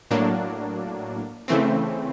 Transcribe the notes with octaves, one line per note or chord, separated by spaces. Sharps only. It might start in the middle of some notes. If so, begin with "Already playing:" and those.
A2 F#3 A#3 D4
C#3 E3 A3 C4